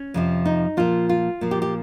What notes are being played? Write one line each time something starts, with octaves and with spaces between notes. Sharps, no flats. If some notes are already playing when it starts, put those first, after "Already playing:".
Already playing: C#4
F2 C3 F3
D#4
A#2 F3 F4
F4
A#2 F3
G4
G4